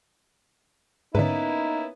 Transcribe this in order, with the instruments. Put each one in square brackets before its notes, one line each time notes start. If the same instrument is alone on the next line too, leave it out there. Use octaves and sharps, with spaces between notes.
[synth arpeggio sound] G#2 D3 [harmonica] A#3 E4 [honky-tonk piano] B3 C#4 B4 [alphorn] D#4